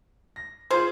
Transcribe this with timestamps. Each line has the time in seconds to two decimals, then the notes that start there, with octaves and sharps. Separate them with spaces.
0.36 A#6
0.71 F4 G#4 C5